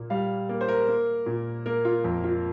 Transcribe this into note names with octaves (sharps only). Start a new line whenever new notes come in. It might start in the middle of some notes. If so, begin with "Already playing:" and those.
Already playing: A#2 A#3
G3 F5
A#3
C5
A#4
A#3
A#2
A#3 A#4
F4
F2 A#4
F4